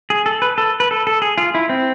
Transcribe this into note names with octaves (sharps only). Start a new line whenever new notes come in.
G#4
A4
B4
A4
B4
A4
A4
G#4
F4
E4
C4